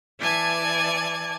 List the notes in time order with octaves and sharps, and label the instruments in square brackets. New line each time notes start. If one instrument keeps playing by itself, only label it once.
[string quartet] E3 D5 G#5 A5 G#6